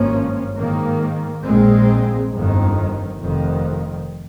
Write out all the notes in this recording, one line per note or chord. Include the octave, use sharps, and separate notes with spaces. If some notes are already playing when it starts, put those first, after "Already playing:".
Already playing: G#1 G2 F3 A#3 C#4
G#2 D#3 A#3
A#1 A#2 G#3 C4
G1 F2 D#3
F1 F2 D#3